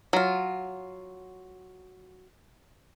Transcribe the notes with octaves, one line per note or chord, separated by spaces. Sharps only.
F#3 F4